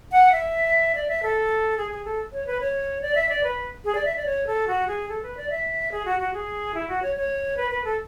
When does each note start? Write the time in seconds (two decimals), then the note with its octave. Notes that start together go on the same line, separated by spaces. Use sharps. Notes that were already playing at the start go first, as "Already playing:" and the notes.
0.12 F#5
0.32 E5
0.95 D5
1.08 E5
1.23 A4
1.77 G#4
1.91 G#4
2.05 A4
2.33 C#5
2.47 B4
2.61 C#5
3.02 D5
3.15 E5
3.29 D5
3.44 B4
3.85 G#4
3.95 D5
4.05 E5
4.16 D5
4.26 C#5
4.47 A4
4.67 F#4
4.88 G#4
5.09 A4
5.23 B4
5.37 D5
5.50 E5
5.92 G#4
6.05 F#4
6.19 F#4
6.34 G#4
6.75 E4
6.88 F#4
7.02 C#5
7.16 C#5
7.57 B4
7.71 B4
7.85 A4